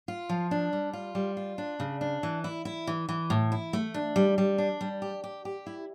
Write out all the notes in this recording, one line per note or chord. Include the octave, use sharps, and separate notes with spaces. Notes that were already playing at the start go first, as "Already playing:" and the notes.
F4
F3
D4
G3
F4
G3
F4
D4
C#3
D4
E3
E4
E4
E3
E3
A2
E4
A3
D4
G3
G3
D4
G3
G4
G4
G4
E4